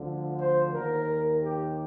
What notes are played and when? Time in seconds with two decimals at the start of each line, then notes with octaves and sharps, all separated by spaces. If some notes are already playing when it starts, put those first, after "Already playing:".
Already playing: D2 D3 F3
0.40 C5
0.74 D#2 D#3 A#4
1.42 G4